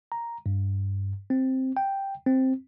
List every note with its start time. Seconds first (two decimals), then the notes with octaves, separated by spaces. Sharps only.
0.12 A#5
0.46 G2
1.30 C4
1.77 G5
2.26 C4